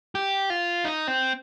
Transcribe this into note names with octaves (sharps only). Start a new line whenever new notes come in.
G4
F4
D#4
C4